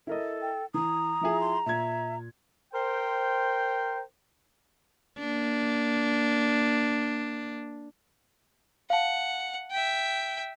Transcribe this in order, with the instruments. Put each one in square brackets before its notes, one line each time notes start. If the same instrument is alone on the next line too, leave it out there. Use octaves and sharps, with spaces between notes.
[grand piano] E4 A#4 D#5 [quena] A4
[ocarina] G5
[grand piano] E3 [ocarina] A#5 [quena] D#6
[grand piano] F3 E4 G#4
[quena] C6
[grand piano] A#2 G#6 [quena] E5
[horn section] A#4 C5 G5
[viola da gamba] A#3 D4
[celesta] F5 A5 [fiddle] F#5
[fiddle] E5 G5